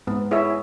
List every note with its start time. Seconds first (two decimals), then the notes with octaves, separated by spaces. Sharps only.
0.07 G#2 B3
0.31 E4 G#4 C#5 E5